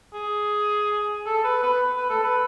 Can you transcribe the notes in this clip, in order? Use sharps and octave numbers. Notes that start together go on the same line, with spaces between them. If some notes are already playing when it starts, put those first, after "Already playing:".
G#4
A4
B4
B4
B4
A4
B4